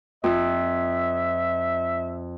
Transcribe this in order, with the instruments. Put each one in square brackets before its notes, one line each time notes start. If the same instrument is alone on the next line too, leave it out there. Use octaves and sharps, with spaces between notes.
[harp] F2 [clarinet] E5